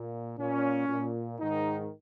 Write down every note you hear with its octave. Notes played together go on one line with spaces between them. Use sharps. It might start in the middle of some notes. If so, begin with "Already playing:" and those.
Already playing: A#2
A#2 C#4
A#2
G#2 D#3 D#4